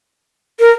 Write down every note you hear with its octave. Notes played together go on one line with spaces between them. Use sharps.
A#4